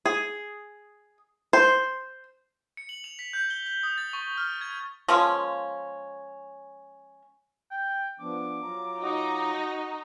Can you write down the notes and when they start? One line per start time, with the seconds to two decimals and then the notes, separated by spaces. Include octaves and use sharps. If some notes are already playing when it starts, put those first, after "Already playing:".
0.05 G#4
1.53 C5
2.77 C#7
2.89 F#7
3.04 F7
3.19 B6
3.33 G6
3.50 G7
3.66 G7
3.83 D#6
3.98 A6
4.13 C#6
4.37 F6
4.61 G#6
5.08 F3 G#3 A#3 C#4
7.71 G5
8.20 F3 B3 D4 D6
8.63 F#3 F4 A#5
9.01 D#4 F#4 D#5